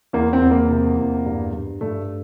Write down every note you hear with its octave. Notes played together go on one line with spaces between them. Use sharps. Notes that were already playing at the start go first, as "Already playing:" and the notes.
E2 A#3
C4
E2
A#3
C3
E2
G2
G2
G2 A3